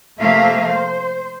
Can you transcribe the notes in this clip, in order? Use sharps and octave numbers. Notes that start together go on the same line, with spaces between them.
C3 F3 A3 A#3 E5 F5
C5